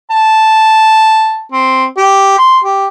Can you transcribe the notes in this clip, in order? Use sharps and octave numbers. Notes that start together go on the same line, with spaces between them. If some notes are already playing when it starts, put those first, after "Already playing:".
A5
C4
G4
C6
G4